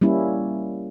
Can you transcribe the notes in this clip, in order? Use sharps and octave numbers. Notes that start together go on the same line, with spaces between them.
G3 A#3 C#4 E4